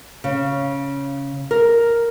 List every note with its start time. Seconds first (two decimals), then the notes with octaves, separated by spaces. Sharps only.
0.24 C#3
1.51 A#4